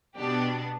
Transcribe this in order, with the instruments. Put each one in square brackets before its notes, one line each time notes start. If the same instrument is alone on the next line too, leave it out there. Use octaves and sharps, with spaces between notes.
[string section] B2 B3 D4 G4